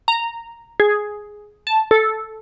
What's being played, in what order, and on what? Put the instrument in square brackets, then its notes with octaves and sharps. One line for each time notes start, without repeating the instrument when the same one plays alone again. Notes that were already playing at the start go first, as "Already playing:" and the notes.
[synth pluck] A#5
G#4
A5
A4